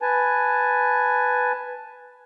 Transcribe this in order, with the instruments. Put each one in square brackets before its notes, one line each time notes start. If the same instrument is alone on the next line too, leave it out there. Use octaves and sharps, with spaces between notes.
[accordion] B4 G#5 A5